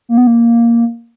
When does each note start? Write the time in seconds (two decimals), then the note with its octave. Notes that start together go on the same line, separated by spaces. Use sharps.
0.09 A#3
0.18 B3
0.27 A#3